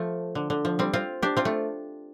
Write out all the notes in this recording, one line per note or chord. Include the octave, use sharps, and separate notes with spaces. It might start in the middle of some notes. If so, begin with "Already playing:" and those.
Already playing: F3 A3
D3
D3
F3
G3 C4
C4 F4
D4 G4
C4 F4
A3